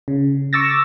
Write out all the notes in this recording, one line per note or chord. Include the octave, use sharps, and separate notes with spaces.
C#3
C#6 D6 E6 A6 A#6